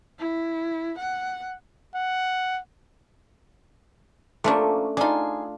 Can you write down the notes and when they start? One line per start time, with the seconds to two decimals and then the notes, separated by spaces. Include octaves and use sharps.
0.19 E4
0.98 F#5
1.94 F#5
4.44 C3 F3 A3 A#3 C#4 D4
4.97 D4 D#4 F4 G#4